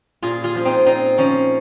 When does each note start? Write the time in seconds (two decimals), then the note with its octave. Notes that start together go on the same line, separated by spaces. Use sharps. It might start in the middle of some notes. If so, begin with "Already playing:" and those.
0.22 A#2 F4 G#4
0.44 F4 G#4
0.55 F3 F4
0.65 C4 D#4
0.86 A#2 C4 D#4
1.18 F3 A#3 C#4